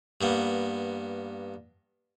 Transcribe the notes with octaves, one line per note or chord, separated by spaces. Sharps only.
G2 A#3 B3